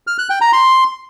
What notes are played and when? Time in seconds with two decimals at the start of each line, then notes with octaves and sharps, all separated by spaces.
0.07 F6
0.19 F#6
0.30 G5
0.41 A#5
0.53 C6